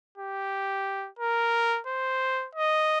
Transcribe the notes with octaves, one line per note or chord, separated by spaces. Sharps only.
G4
A#4
C5
D#5